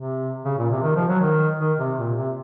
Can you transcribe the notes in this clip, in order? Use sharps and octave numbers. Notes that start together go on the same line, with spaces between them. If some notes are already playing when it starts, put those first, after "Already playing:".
Already playing: C3
C#3
A#2
C3
D#3
F3
F#3
D#3
D#3
C3
A#2
C3